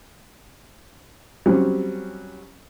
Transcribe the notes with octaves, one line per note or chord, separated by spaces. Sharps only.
F#3 G3 C4 C#4